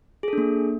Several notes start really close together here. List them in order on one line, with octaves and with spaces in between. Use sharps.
G#4 A4 D4 A#3